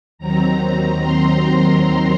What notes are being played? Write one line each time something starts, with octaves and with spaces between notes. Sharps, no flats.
D#2 D#3 F#3 C4 A#5
C6
A#5